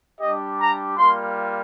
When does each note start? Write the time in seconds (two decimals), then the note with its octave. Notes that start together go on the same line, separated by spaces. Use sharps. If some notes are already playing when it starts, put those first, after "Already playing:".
0.20 G3 D4 G4 D#5
0.59 A#5
0.97 G3 A#3 F4 C6